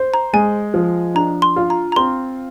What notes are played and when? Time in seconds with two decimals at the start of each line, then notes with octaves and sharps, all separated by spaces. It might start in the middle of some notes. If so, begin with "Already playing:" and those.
Already playing: C5
0.14 A#5
0.33 G#3 G#5
0.74 F3
1.15 D4 A#5
1.42 C6
1.56 F4
1.70 A#5
1.92 A#5
1.96 C4 C6